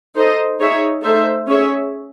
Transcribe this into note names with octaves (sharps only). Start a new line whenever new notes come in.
D#4 A4 C5 D#5
D#4 G#4 C#5 E5
A3 D#4 A4 C5 E5
C#4 G#4 C#5 E5